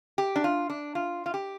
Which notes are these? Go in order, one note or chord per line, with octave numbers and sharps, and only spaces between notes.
G4
D4
F4
D4
F4
F4
G4